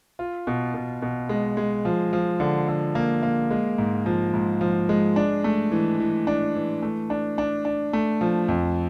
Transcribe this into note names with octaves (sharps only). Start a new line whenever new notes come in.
F4
B2
B2
B2
G#3
G#3
F3
F3
D3
D3
A#3
A#3
G#3
G#2
F3
G#2
F3
G#3
D4
A3
E3
E3
D4
E3
A3
D4
D4
D4
A3
F3
F2